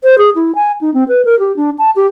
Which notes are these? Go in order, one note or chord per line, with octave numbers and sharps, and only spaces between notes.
C5
G#4
E4
G#5
D#4
C4
B4
A#4
G4
D4
A5
G4